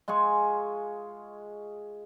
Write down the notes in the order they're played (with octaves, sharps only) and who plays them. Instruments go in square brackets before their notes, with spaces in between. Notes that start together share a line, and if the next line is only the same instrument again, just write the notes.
[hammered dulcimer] G#3 F4 G#4 C#6